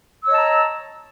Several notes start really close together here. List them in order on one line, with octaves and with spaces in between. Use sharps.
E6 C#5 D#5 A5 A#5